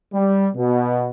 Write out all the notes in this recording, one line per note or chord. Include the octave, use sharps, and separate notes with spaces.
G3
B2